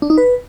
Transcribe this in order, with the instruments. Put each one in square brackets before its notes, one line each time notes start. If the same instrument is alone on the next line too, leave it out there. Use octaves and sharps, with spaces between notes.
[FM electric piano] D4
D#4
B4